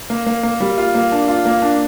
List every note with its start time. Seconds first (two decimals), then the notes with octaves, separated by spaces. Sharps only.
0.10 A#3
0.26 A#3
0.43 A#3
0.60 G3
0.78 F4
0.95 A#3
1.12 D4
1.28 F4
1.45 A#3
1.62 D4